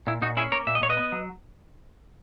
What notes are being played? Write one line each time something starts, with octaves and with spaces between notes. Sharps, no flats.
A#2 E4
A#2 D#4 F#4
C#4 E4 G#4
A#3 A#4 C#5
A#2 E5
D#5
A#2 C#5
B4 D#5
B3
F#3